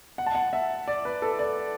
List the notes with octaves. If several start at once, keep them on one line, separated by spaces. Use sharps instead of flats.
F#5
A5
F#5
E5
D5
B4
A4
D5